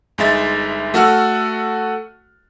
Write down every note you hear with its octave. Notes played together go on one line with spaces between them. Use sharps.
G1 G#3 D#4 E5 A6
A3 F#4 A4 F#5 E6 F6